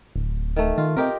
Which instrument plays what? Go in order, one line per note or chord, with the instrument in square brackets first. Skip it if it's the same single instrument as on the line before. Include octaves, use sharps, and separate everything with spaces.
[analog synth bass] D1
[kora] D#3 A3
[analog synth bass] D#3 [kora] F4
[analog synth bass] C3 [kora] D#4 G4 A#4